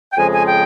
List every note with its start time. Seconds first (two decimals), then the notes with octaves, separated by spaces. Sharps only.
0.12 G5
0.17 F2 C#3 F3 G#3 G#5
0.33 G#5
0.46 G5